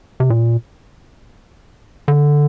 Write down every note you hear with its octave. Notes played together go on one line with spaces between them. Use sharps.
C3
A#2
D3